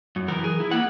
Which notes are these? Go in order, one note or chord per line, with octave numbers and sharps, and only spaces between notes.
F#2
E3 A#4
G#4
E4
A#3 F#5